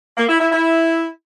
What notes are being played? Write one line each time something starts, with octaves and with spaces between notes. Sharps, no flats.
A#3
E4
E4
E4